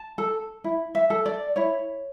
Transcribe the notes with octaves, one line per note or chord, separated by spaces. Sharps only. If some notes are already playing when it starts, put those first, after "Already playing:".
Already playing: A5
A4
E4
E5
A4
D5
E4 C#5